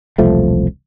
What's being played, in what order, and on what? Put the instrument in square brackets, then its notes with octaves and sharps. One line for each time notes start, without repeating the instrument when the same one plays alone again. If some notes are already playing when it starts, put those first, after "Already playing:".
[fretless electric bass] E1 C2 F3 A3